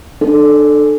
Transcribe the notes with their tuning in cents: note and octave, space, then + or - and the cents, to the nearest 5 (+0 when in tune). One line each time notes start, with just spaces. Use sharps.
D4 +30 A4 -5